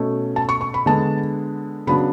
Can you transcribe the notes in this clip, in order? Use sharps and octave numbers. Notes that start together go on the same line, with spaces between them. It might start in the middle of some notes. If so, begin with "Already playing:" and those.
Already playing: B2 A3 C#4
A5
C#6
C#6
B5
D3 G#3 B3 D4 A5
C#3 F#3 B3 D4 B5